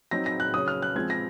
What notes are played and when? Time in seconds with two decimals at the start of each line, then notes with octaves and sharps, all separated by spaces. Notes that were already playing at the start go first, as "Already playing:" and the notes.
0.11 F#3 C4 D#4 A#6
0.26 A#6
0.40 F#6
0.54 C#3 F#3 C#4 D#6
0.68 F6
0.82 F#6
0.95 F3 G#3 C4 G#6
1.10 A#6